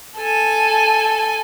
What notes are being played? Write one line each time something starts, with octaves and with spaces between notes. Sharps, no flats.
A4 G#5